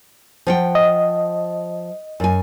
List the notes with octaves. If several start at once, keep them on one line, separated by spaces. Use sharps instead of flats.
F3 F#5 G5
D#5
F#2 G#5